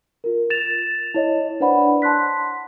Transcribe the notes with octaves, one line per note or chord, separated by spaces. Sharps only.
F4 A#4
A6 E7 F7
E4 C#5 D#5
D4 B4 C5 D5 F#5 B5
A5 C6 F#6 B6